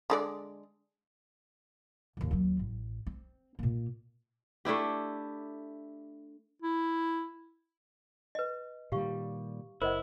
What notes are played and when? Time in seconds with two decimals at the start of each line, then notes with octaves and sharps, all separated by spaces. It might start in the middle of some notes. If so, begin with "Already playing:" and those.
0.10 D3 G#3 D5
2.17 G#1 D#2
2.31 D#2 F#3
2.59 A1
3.07 C4
3.59 A#2 A#3
4.65 A3 D4 E4 G4
6.62 E4
8.35 B4 D#5
8.92 A#2 D#3 G3 G4 F5 C#6
9.82 F#1 E4 A#4 C5 D#5 F#5